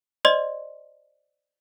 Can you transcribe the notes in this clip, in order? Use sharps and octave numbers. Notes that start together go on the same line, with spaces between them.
C5 D5 D#5 C6